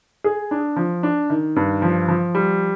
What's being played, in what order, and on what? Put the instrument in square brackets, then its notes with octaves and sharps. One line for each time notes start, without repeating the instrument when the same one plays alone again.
[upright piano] G#4
D4
F3
D4
D#3
G2
F3
F3
G3